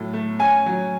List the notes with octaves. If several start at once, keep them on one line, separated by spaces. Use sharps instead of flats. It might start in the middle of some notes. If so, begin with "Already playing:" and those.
Already playing: A2 F#3
A3
C#4 G#5
F#3